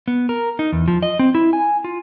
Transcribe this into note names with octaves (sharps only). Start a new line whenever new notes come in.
B3
A#4
D#4
E2
F3
D#5
C4
E4
G#5
F4